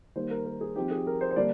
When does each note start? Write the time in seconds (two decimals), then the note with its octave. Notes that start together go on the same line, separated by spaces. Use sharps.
0.16 D#3 G3 A#3 C5
0.31 A#4
0.46 A#4
0.61 G#4
0.76 F3 C4 D#4 G4
0.91 G#4
1.07 A#4
1.21 C5
1.31 C5
1.36 D3 G3 A#3 D4 D5